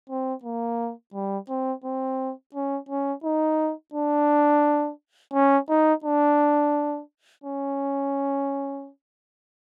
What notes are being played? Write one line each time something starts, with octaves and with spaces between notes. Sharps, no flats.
C4
A#3
G3
C4
C4
C#4
C#4
D#4
D4
C#4
D#4
D4
C#4